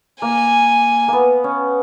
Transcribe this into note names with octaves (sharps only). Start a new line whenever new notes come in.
A#3 G#5
A#3 B3
C#4